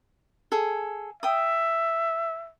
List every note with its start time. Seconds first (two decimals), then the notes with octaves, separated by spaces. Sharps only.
0.52 G#4 A4
1.23 E5 G5 D#6